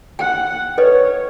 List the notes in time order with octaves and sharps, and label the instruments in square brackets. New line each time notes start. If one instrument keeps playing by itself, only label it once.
[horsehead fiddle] F#5 [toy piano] G5
[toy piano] A4 B4 D#5 [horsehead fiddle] C#5